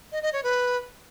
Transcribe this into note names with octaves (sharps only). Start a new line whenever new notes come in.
D#5
D#5
C#5
B4